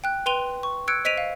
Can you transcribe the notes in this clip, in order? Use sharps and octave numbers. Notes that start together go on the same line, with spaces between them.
G5 F#6
B4 G5 C6 D#7 F7 G7
C#6
E6 F#6 G#6 C#7 D7
C5 D#5 B6 D7 D#7 F7
F5